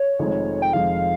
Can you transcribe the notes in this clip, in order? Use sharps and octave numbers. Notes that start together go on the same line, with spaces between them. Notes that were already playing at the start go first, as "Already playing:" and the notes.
Already playing: C#5
F1 F2 D#3 G#3
G5
F1 F2 D#3 G#3 F5